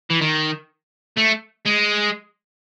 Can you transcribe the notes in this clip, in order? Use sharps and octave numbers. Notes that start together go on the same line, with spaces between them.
E3
D#3
A3
G#3